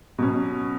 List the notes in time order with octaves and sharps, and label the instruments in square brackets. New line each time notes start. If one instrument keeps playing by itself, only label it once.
[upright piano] B2 F#3 C#4